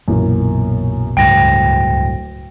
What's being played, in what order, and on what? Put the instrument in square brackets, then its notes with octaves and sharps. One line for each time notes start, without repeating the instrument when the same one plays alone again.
[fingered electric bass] B1 A#2 [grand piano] F#2 E3 A#3
[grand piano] D1 D7 [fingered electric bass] C#2 G2 [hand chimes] G5 A#6